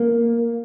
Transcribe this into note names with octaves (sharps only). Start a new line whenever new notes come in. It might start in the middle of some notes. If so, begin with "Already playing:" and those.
Already playing: A#3